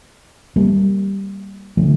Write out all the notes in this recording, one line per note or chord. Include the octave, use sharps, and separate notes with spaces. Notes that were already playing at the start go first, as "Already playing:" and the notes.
G3 A#3
D3 F3 A3